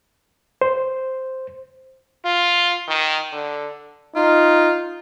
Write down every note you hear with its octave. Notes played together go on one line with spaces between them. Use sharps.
C5
F4
D#3
D3
D#4 F4